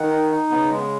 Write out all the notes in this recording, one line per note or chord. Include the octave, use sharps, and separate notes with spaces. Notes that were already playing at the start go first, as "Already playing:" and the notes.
Already playing: D#3 F#5
D#4
D#4
C#3 B3
G#3